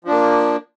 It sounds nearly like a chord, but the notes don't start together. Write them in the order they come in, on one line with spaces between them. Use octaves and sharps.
F3 D4 A#3